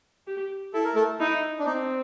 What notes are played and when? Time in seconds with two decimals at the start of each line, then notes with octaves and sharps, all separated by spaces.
0.27 G4
0.74 E4 A4
0.85 A#4
0.95 A3 A4
1.20 D#4 E4
1.59 D4
1.66 C4 D#4